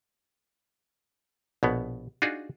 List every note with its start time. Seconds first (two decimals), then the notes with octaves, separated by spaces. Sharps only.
1.63 A#1 B2 B3
2.22 D4 D#4 F4 F#4 G#4